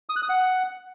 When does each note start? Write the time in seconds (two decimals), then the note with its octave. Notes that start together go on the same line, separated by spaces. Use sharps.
0.09 D#6
0.16 F#6
0.23 D#6
0.29 F#5